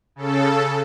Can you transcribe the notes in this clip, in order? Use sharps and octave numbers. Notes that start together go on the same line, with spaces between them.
C#3 A4